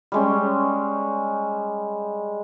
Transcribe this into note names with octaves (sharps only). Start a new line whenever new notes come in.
G3 G#3 C#4